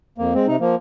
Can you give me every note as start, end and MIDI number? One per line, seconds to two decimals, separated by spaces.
0.18 0.33 41
0.18 0.33 58
0.34 0.47 56
0.34 0.47 60
0.47 0.56 48
0.47 0.56 63
0.60 0.75 53
0.60 0.75 58